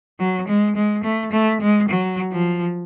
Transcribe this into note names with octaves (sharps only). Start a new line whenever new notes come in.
F#3
G#3
G#3
A3
A3
G#3
F#3
F3